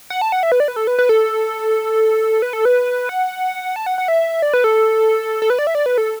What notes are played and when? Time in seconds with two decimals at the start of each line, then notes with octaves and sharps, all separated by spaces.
0.10 F#5
0.21 A5
0.32 F#5
0.43 E5
0.52 B4
0.60 D5
0.68 B4
0.76 A4
0.87 B4
0.99 B4
1.09 A4
2.42 B4
2.53 A4
2.65 B4
3.09 F#5
3.76 A5
3.86 F#5
3.98 F#5
4.08 E5
4.42 D5
4.53 B4
4.64 A4
5.42 A4
5.50 B4
5.59 D5
5.67 E5
5.75 D5
5.86 B4
5.98 A4